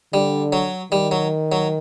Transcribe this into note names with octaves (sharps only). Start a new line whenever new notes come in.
D3 G3
F#3
D#3 G3
F#3
F#3